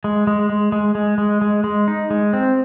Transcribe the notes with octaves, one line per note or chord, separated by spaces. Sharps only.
G#3
G#3
G#3
G#3
G#3
G#3
G#3
G#3
D#4
G#3
C4